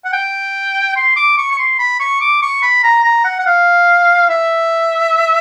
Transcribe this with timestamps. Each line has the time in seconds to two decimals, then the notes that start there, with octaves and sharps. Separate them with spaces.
0.05 F#5
0.13 G5
0.96 C6
1.16 D6
1.38 C#6
1.51 C#6
1.59 C6
1.79 B5
2.00 C#6
2.21 D6
2.42 C#6
2.62 B5
2.83 A#5
3.04 A#5
3.24 F#5
3.39 F#5
3.46 F5
4.29 E5